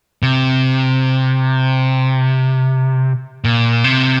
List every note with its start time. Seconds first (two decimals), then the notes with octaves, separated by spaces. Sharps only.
0.22 C3
3.44 A#2
3.84 C3